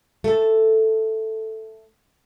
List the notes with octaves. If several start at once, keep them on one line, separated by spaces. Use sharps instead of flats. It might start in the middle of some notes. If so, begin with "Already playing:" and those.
A3 A4